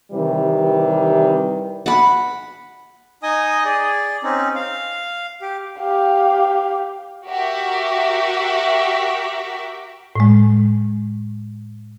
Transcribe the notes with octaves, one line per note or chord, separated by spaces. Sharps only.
C3 D#3 E3 G3
F#5 B5
D#4 D#5 G#5 D#6
G#4 D5
C4 C#4 D#4
F5
G4
G4 F5
F#4 G4 A#4 E5
A2 G#3